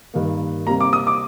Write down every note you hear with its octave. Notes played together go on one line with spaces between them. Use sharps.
G2 D#3 A#3
C3 G3 A#3 A#5
D6
D#6
D6